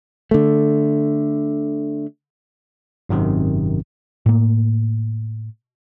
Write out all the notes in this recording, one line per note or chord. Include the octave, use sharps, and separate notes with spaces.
D3 A3
G#1 F#2 C3 D#3
A2 A#3